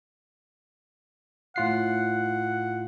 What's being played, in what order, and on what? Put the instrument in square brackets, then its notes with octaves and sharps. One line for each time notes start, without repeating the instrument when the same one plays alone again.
[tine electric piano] A2 F4 C7 [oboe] F#5